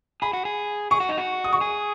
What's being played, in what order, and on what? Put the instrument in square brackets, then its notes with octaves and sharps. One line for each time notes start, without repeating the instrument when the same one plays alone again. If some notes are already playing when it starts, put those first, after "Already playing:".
[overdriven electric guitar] G#4 [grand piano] B5
[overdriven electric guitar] F#4
G#4
[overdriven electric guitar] G#4 [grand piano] C#6
[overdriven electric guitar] F#4
D#4
F#4
[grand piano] D#6
C#6
[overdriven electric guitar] G#4